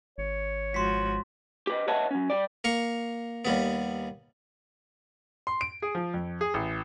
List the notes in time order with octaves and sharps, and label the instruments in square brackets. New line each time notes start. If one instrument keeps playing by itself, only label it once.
[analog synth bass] G#1 [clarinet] C#5
[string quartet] G#2 F3 F#4 [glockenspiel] C6 B6
[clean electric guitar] G4 B4 D#5
B4 C#5 D#5 E5 F#5 A5
F#3 C#4
G3 D5
[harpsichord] A#3 F5 C#6
D#2 G3 B3
[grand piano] C6
D7
G#4
F3
F2
G#4
A1